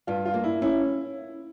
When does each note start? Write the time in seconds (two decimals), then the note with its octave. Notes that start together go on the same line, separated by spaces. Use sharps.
0.07 G2 F4
0.25 F4
0.34 A#3
0.44 E4
0.62 C#4 E4